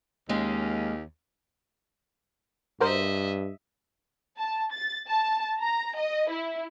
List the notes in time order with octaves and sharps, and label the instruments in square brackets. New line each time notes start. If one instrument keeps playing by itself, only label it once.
[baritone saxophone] D#2 [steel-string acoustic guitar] G#3 A#3 C#4
[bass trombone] G2 [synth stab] F#4 A#4 C5 [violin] D#5 E5
[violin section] A5
A6
A5
A#5
D#5
E4